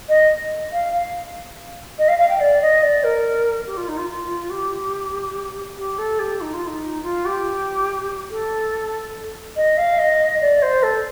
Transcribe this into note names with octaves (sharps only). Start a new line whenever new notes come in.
D#5
F5
F5
D#5
F5
F5
G5
D5
D#5
D5
A#4
G4
F4
D#4
F4
F4
G4
G4
A4
G4
D#4
F4
D#4
F4
G4
A4
D#5
F5
D#5
D5
C5
A4